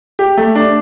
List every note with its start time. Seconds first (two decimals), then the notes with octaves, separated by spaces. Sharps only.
0.19 G4
0.37 A3
0.55 D4